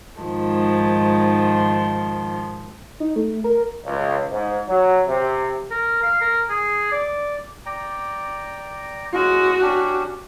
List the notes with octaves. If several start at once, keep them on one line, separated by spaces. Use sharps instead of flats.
G#2 D#3 F3
D#4
A3
A#4
C#2
G#2
F#3
C3
A#4
F5
A#4
G#4
D5
D5 G5 A#5
G#3 C#4 F#4 D#5
C#4 D4 G4